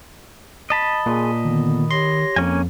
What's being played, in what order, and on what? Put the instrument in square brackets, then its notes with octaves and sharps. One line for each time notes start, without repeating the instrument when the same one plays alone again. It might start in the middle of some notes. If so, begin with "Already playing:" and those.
[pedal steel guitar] D#5 A5 B5
[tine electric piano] A#2 [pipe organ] G#4 G#5 C6
[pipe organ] D3 B3 [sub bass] D#3
[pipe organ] G4 C#5 A#6 [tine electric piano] C6
[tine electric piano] F2 [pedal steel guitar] A#3 C#4 G#5